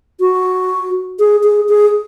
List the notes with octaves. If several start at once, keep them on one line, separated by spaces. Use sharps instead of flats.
F#4
G#4
G#4
G#4